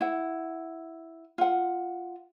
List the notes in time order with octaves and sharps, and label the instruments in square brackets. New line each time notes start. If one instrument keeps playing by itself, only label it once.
[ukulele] E4 F#5
F4 F#5